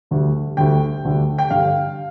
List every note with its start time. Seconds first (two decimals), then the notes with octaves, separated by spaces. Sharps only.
0.11 D2 D3 G3
0.57 D2 D3 G3 G5
1.04 D2 D3 G3
1.38 G5
1.50 G2 D3 G3 F5